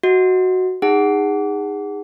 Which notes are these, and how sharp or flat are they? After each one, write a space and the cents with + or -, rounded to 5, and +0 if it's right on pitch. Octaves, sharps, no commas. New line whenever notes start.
F#4 +0 D#5 +30
D#4 +0 G#4 -25 F#5 +5